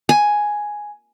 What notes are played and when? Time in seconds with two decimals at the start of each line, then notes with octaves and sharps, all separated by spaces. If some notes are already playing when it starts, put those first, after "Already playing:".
0.09 G#5